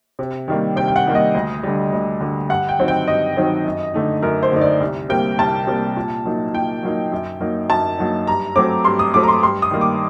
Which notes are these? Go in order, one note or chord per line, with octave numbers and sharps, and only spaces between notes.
C3
D#3 G3 A#3
C3 G5
G5
F#5
D#3 G3 A#3
D#5
D2
D3 G3
D2
D3 G3
G2 F#5
G5
D#3 F#3 C4 D#4
G5
G2 D#5
D#3 F#3 C4 D#4
F#2
D3 A3 D#4
F#2 A#4
C5
D3 A3 D#4
D5
C2
C3 G3 A#3 G5
C2 A5
C3 G3 A#3
A#2
F#3 A#3 D#4
A#2 G5
F#3 A#3 D#4
F#2
F#3 A#3 D#4
F#2 A5
F#3 A#3 D#4
G2 A#5
F#3 A3 C4 D6
G2 C6
D#6
F#3 A3 C4 D6
A#5
C6
G2 C6
D#6
D#3 G3 A#3 D#4
D6